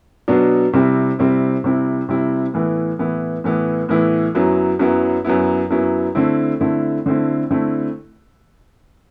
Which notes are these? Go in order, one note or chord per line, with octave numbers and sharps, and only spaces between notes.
B2 F#3 B3 D4
C3 G3 C4 E4
C3 G3 C4 E4
C3 G3 C4 E4
C3 G3 C4 E4
A2 E3 B3 E4
A2 E3 B3 E4
A2 E3 B3 E4
A2 E3 B3 E4
F#2 F#3 B3 E4
F#2 F#3 B3 E4
F#2 F#3 B3 E4
F#2 F#3 B3 E4
D3 A3 C4 E4
D3 A3 C4 E4
D3 A3 C4 E4
D3 A3 C4 E4